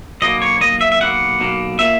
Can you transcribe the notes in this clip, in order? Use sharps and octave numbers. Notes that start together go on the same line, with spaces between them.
B1 B2 A#3 D#5
C#5
B2 A#3 D#5
B1
E5
E5
B1 B2 A#3 F#5
B1 B2 A#3
A#2 A#3 E5